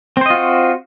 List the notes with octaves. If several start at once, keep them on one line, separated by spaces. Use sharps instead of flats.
C4 F4 F#4 C5 D#5